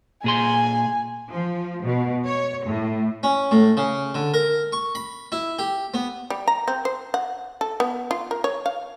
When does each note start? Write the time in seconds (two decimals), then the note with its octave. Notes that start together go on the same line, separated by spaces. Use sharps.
0.24 A#2 G#4 G#5 C6
1.30 F3
1.83 B2
2.25 C#5
2.65 A2
3.23 C#4
3.51 A2
3.77 C#3
4.15 D3
4.34 A#4
4.72 C#6
4.95 B5
5.32 E4
5.59 G4
5.94 B3
6.30 G3
6.48 A#5
6.68 C4
6.85 C5
7.14 F#5
7.61 A4
7.80 B3
8.11 F4
8.31 A#4
8.44 C#5
8.66 F5